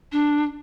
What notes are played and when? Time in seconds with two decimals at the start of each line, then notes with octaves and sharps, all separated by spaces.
0.12 D4